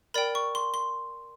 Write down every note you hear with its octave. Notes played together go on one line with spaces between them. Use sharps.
A#4 D5 G5 B5
C#6
C6
C6